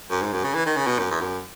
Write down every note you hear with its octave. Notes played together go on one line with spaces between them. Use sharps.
F#2
G#2
F#2
C#3
E3
D#3
C#3
B2
F#2
E2
F#2